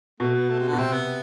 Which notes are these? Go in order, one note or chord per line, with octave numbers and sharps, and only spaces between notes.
B2 A3
B3
A3
C3
D3
B2
C3 C4
B3